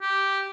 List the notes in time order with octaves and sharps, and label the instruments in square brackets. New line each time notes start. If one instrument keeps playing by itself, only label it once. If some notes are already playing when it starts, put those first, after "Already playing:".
[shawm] G4